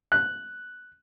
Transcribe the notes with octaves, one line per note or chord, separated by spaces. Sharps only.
F#6